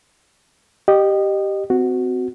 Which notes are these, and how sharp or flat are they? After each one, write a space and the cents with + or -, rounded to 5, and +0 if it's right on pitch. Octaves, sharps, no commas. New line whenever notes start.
G4 -10 D#5 -25
C4 -30 F#4 +0